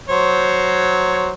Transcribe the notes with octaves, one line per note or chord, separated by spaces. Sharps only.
F#3 C5 C#5